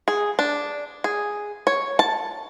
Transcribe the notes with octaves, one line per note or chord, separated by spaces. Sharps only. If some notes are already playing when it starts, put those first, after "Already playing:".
G#4
D4
G#4
C#5
A5